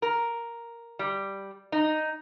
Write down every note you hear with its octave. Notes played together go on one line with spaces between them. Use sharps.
A#4
G3
D#4